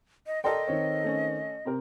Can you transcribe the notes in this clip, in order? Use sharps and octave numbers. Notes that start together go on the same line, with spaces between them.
D#5
A4 A#4 D5 D#5 G5 C6
D#3 C4 C#5
A3 C#4
C3 C4 A#4